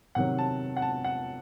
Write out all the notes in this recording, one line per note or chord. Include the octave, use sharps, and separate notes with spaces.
C3 D#3 F#3 F#5
A5
F#5
A5
F#5